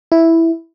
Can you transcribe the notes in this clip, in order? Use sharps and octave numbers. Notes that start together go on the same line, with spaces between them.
E4